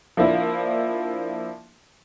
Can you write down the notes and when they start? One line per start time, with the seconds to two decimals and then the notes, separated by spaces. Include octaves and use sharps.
0.17 F3 A#3 D4 E4